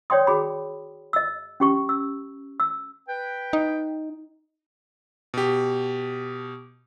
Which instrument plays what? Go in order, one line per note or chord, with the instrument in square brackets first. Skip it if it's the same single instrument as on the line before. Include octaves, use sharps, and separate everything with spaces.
[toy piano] C#5 D5 G5 C6 D#6
F#4 G#4 B5
D#5 E6
C#4 G4 C#6
E6
E6
[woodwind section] B4 G5
[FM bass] D#4
[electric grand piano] B2 G4